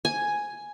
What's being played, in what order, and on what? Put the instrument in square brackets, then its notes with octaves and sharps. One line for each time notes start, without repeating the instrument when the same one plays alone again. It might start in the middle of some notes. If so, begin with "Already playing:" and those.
[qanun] G#5